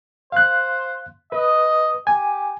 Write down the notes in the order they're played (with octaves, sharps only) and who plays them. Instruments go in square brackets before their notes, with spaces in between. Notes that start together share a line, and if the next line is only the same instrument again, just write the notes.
[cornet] C5 [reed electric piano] F5 F#6
[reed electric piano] B4 [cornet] D#5
[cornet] G4 [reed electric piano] G#5